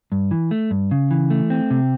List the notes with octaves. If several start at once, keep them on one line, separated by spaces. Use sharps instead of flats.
G2
E3
A3
G2
C#3
E3
A3
C4
C3